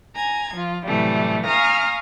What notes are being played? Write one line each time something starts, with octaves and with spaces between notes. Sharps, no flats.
G#5 A#5 G#6
F3 F4
A2 C3 E3 F#3 G3 A3
F5 G#5 A#5 C#6 D#6 F6